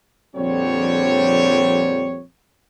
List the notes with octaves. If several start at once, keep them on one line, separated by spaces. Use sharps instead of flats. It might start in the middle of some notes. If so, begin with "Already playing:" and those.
A#1 F2 D3 G3 C4 C#5